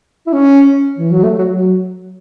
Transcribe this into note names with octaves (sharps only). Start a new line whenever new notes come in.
E4
C#4
E3
F#3
A3
F#3
F#3